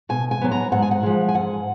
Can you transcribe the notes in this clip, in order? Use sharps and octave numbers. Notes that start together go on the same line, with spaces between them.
B2 G#5
G#5
F#3 B3
A#5
G#2 F#5
G#5
F#5
F3 G#3
G#5
G#2 F#5